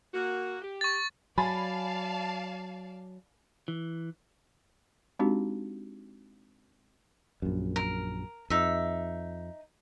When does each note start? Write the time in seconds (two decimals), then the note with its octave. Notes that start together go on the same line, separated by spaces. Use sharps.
0.14 A#3 F#4
0.62 G4
0.81 C#6 A6
1.38 F#3 D5 F5 G#5 A5 B5 A6
3.68 E3
5.19 G#3 C4 D4 D#4 F#4 G4
7.42 A#1 F#2
7.76 A#4
8.50 F2 D#4 E5